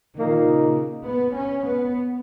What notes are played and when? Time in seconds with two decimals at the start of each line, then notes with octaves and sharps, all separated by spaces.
0.17 A#2 D#3 A#3 D#4
0.46 C#3
1.05 B3
1.35 C#4
1.64 B3